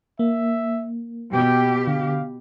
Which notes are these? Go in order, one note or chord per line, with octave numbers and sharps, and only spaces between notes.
A#3 E5
B2 G4 G5
D3 F5